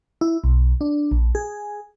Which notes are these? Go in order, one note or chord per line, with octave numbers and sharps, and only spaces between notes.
E4
B1
D4
A#1
G#4